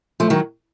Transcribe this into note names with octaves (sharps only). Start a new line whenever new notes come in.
F3 A3
D#3 F#3